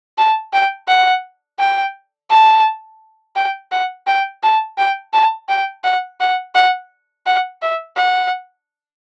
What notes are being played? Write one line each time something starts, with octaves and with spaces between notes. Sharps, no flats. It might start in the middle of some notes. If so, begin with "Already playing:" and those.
A5
G5
F#5
G5
A5
G5
F#5
G5
A5
G5
A5
G5
F#5
F#5
F#5
F#5
E5
F#5